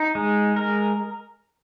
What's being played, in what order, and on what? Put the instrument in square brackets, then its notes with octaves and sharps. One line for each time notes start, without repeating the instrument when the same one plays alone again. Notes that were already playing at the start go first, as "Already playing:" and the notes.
Already playing: [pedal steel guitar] D#4
G#3
A#4